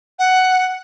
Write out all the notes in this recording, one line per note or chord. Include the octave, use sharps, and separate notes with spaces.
F#5